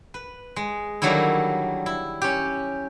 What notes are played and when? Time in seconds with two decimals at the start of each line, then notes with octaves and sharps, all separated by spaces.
0.14 B4
0.56 G#3
1.02 D3 D#3 F#3 G3 A#3 E4
1.86 E4
2.22 C#4 G4